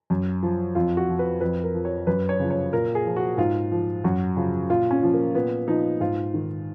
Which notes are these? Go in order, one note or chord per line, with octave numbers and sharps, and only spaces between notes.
F#2
F3
F2 F4
F#4
F3
B4
F2 B4
A#4
F3
C#5
F#2 B4
C#5
C#3 F3
C#5
A#2 A#4
G#4
F3
F#4
G#2 F4
F3
F#2 F#4
C#3 F3
A#2 F4
C#4
F3
A#3
A#2 B3
F3 D#4
G#2 F4
D#3